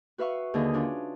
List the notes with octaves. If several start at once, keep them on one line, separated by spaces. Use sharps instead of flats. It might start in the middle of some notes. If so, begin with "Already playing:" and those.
F#4 B4 E5 F5 C#6
D#2 D3 G#4 D#5
C#4 D4 F4